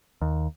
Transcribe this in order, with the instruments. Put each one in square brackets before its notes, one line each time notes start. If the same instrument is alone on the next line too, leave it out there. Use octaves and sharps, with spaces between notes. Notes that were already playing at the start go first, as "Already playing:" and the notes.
[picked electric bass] D#2